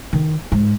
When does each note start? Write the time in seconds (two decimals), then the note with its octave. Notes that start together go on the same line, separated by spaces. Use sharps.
0.13 D#3
0.52 G#2